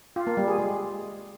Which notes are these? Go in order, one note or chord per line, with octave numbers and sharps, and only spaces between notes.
F4
A#3
G3
G#4
G#3